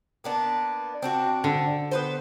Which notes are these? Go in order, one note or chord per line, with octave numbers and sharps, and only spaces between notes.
A#3 B3 D4
C4 D4 F#4
D3
B3 B4 C5